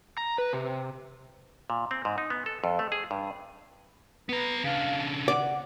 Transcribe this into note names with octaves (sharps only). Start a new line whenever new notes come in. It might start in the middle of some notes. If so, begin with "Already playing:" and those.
A#5
B4
C3
A#2
C4
G#2
D#4
B3
A4
F2
A3
G#4
G2
B3 B4 A#5
C#3 D4 F5
D5 F#5